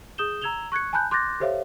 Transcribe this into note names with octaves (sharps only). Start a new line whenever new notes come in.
G#4 D#6 G6 E7 G7
A#5 E6 G#6 E7 F7 G7
C#6 F#6 G#6 C#7
G#5 A5 B5 F#6 G6
C6 D6 F#6 G6 A6 A#6
G4 A4 C5 C#5 E5 F5